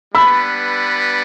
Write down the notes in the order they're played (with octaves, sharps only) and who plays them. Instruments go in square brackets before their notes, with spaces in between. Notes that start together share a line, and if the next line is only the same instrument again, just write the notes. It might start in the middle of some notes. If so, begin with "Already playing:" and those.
[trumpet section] G3 B3 D4 B4 [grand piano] B5 E6